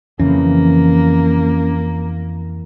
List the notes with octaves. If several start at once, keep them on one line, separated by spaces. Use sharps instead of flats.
F2 C#3 E3 A#3 C#4